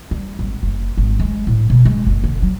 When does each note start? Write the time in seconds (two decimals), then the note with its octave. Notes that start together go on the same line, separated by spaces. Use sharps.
0.11 G3
0.39 G#1
0.63 F#1
0.97 G#1
1.20 G#3
1.47 A2
1.70 B2
1.85 G#3
2.07 F#1
2.24 D3
2.43 F#3